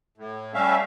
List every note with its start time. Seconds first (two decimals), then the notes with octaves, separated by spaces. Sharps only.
0.17 A2
0.54 G3 A3 C#4 E5 F5